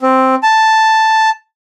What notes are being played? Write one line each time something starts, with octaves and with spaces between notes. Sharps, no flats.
C4
A5